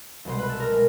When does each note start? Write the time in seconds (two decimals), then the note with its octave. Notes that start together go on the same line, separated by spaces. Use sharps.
0.25 C2 B2 G#3 C5
0.39 B4
0.49 A4
0.60 A#4
0.72 B2 G#3